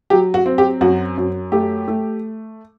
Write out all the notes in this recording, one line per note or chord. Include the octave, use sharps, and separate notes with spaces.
F#3 G4
F#4
C4
G4
F#2 F#4
F#2
A3 G4
A3